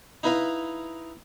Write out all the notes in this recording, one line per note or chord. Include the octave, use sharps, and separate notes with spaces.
D#4 E4 B4 D#5 F5